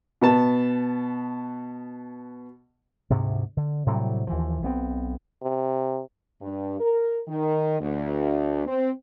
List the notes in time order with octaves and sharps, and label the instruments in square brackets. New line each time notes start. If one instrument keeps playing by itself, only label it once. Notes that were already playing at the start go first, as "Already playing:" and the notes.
[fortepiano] B2 B3 A5
[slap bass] D2 G#2 C3
D3
A2 C3 F#3 G3
D#2 E3 F3
B1 B3 C4
[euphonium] C3
[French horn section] G2
A#4
D#3
D2
C4